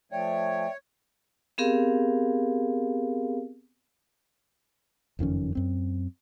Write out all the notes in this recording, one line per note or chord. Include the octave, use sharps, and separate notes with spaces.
F3 A3 C#5 D5 E5 G5
B3 C4 G4 G#4 A#4 F5
F#1 F2 D#3 C#4
F#2 C4